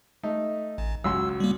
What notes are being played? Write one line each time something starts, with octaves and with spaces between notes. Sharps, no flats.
A3 D#4
A1
C#2 F#3 C6 E6
G3 A#3